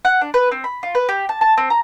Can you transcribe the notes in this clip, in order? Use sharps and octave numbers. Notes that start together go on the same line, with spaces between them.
F#5
D4
B4
C4
B5
F4
B4
G4
A5
A5
C4
A#5